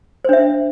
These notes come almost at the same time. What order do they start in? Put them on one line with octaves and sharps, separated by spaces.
C5 D4 E5